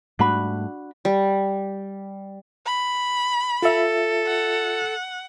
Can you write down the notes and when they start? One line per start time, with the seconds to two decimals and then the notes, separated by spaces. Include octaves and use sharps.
0.19 G#2 G3 A3 D4 F#4 B5
1.05 G3
2.66 B5
3.62 F4 A4 E5
4.26 F#5